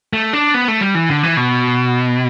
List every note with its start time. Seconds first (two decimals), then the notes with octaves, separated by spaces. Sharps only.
0.13 A3
0.33 D4
0.54 B3
0.68 A3
0.81 G3
0.95 E3
1.09 D3
1.23 E3
1.37 B2